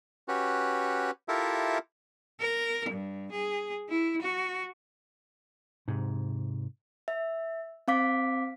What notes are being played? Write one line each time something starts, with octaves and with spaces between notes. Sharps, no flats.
C#4 F#4 G4 B4
E4 F4 G4 A4 A#4 E5
A#4
G2
G#4
E4
F#4
G#2 C3
E5
C4 F5 D6 B6